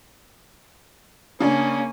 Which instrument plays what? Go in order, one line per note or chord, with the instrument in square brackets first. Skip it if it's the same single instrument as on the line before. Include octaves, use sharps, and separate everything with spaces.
[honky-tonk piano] C#3 D4 [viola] A#3 C#4